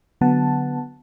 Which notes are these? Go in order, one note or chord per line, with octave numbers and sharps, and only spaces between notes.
D3 F#3 B3 F#5 A5